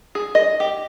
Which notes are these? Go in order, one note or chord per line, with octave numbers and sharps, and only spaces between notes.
G#4
D#5
G4